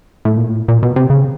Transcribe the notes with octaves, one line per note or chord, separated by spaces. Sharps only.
A2
A#2
A2
A#2
B2
C3
C#3